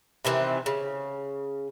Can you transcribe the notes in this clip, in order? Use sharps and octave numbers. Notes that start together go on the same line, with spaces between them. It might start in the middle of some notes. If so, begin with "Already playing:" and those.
C3 D#3 E3 C4
C#3